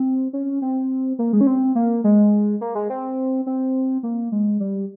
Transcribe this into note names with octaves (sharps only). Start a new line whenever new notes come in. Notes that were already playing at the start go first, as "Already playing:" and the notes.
Already playing: C4
C#4
C4
A#3
G#3
C#4
C4
A#3
G#3
A#3
G#3
C4
C4
A#3
G#3
G3